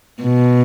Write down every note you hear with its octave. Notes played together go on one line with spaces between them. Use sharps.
B2